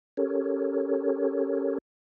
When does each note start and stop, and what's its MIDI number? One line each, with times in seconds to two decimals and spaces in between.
0.17 1.78 61
0.17 1.78 67
0.17 1.78 69
0.17 1.78 70
0.17 1.78 73